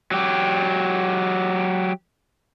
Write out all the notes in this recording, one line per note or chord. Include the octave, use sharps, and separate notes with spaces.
F#3 G4